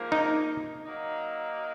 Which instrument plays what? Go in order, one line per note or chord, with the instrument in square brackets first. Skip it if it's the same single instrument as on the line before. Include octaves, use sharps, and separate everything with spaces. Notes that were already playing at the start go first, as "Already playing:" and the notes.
Already playing: [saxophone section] G#2 F3 A#3
[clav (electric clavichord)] D#4
[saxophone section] F#3 A#3 D#4